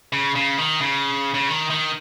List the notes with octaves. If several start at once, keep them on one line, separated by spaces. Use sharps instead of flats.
C#3
C#3
D#3
C#3
C#3
D#3
D#3